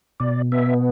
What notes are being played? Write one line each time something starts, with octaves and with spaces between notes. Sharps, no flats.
B2 D5
B3 E5